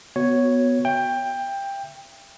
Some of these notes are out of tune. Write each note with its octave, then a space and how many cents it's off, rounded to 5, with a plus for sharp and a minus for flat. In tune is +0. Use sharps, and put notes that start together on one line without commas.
B3 +0 F#4 +0 C#5 +0
E5 +15 G5 +15